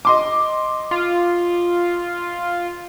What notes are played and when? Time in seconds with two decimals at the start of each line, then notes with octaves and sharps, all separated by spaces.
0.05 D#5 C6 D6
0.91 F4